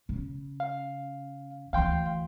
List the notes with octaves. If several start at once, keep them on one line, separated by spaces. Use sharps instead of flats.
C#3
F5
D2 E3 F5 G5 C6